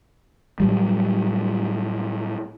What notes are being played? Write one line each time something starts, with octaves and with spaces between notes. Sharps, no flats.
A2 F#3 G3